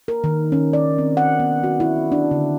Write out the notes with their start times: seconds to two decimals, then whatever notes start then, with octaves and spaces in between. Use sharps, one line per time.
0.08 A#4
0.24 D#3
0.52 C#4
0.73 D5
0.98 C4
1.17 F#5
1.39 B3
1.63 F#4
1.80 E4
2.12 D4
2.31 D3